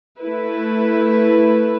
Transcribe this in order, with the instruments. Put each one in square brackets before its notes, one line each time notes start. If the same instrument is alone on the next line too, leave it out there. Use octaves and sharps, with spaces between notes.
[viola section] A3 E4 B4